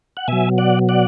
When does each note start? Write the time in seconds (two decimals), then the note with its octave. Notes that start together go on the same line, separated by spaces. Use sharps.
0.17 F#5
0.28 B2 F#3 E5 G#5
0.58 D5 F#5
0.89 D5 F#5